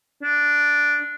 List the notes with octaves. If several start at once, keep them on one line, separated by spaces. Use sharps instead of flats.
D4